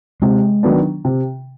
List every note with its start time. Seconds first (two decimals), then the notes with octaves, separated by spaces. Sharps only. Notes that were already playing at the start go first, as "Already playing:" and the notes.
0.22 C3 G#3
0.63 D#3 F#3 B3 D4
1.05 C3